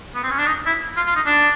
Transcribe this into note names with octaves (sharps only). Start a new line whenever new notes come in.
B3
C4
C#4
D4
D#4
E4
F4
F4
D#4
D4